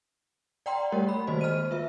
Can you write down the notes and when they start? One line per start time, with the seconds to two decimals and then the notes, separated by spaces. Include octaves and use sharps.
0.66 D5 F#5 G5 A#5 C6
0.92 G3 A3 G4 A#4 C#5
1.09 B5
1.27 D#3 G#3 A#3 F#4 C5 D#5
1.41 F6 D#7
1.71 F4 B4 E5